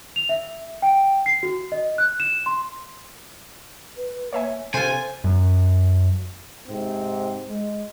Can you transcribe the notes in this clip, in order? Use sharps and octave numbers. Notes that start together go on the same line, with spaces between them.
F7
E5
G5
C7
F#4
D#5
F#6
E7
C6
B4
A#3 C#5 E5 G#5
C3 F4 A4 C5 G#5
F#2
G#2 C3 C4
G#3